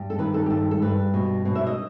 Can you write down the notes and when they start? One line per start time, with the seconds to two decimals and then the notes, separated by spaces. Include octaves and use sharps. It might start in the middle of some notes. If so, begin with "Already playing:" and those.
Already playing: G2
0.10 A4
0.18 D#3 B4
0.34 A4
0.46 G4
0.50 G2 A4
0.71 A4
0.82 G2 B4
1.14 B2
1.45 B2
1.55 E5
1.66 D#5